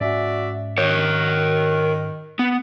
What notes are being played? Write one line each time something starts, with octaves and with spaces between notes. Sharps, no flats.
G#2 C#4 F#4 D5 E5
D#3 A#4 C#5
B3